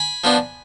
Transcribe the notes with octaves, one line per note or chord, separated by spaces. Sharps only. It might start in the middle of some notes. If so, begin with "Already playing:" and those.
Already playing: G#5 B5
F3 B3 D4